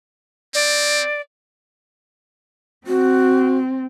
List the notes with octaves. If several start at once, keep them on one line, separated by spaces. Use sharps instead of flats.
C4 D5
C4 F#4